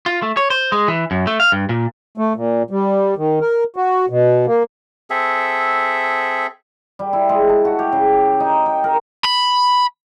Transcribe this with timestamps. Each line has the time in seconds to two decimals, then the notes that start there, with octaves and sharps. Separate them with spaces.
0.06 F4
0.22 A3
0.37 C#5
0.50 C5
0.72 G#3
0.88 E3
1.11 F#2
1.27 A3
1.40 F5
1.52 G2
1.69 A#2
2.18 A3
2.36 A#2
2.71 G3
3.17 D#3
3.41 A#4
3.76 F#4
4.10 B2
4.47 A#3
5.10 C4 G#4 A4 E5
6.99 G3
7.13 E4
7.29 G#3
7.49 A5
7.65 F#4
7.79 G4
7.92 C#3
8.40 D#4
8.66 G5
8.84 A#4
9.25 B5